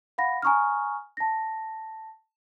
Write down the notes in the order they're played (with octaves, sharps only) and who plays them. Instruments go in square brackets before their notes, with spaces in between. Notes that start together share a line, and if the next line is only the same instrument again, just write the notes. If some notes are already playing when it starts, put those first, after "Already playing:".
[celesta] F5 F#5 B5 A#6
G#5 A#5 C#6 D#6 F6
A5 A#6